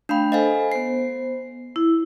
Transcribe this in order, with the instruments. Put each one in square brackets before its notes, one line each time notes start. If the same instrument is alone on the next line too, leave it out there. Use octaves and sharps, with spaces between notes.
[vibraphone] A3 F5 G5 [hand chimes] D4 B5
[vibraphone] A4 C5 [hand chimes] D#5 F5 G#5
[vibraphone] B3 C5 [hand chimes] C7
[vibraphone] E4